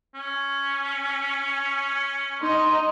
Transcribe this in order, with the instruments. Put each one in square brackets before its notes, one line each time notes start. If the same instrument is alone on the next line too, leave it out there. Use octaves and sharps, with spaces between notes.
[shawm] C#4
[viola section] D#4 D#5 [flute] C6